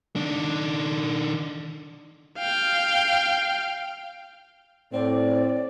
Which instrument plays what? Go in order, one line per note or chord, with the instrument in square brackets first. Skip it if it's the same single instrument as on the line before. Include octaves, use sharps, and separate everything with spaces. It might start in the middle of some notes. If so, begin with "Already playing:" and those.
[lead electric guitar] D#3 D4
[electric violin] F5 G5
[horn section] A2 C4 [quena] D5